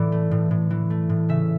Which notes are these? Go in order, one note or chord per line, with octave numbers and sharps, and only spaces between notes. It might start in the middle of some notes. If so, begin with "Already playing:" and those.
Already playing: A2 E3 D5
A3
A2
A2
E3
A3
A2
C#3 E5